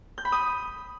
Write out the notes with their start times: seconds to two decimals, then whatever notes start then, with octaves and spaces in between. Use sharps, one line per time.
0.18 G6
0.25 B5
0.32 D#6